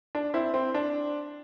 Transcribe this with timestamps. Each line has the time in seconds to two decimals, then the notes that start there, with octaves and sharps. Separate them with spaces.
0.15 D4
0.34 C4 E4
0.54 C4
0.74 D4